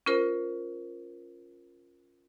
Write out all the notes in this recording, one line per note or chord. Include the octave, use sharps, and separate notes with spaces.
C#4 F4 A#4 C5